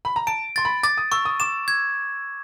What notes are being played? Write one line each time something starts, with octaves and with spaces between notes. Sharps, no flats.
B5
A#5
A5 D7
C6 A6
B5
D6 A6
D#6
C#6 E6
D#6
D6 E7
G#6